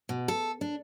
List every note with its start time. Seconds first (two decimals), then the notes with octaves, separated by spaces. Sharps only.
0.09 B2
0.28 A4
0.61 D4